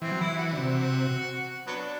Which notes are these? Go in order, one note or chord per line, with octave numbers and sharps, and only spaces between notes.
E3 C4
F#3
E3 E4
F#4
D3
C3
F#3 B3 D4